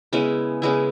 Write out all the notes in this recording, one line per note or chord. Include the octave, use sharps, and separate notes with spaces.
C#3 G#3 B3 E4
C#3 G#3 B3 E4